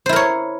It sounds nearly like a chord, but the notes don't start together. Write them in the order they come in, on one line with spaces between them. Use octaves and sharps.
C5 E4 A#4 C#5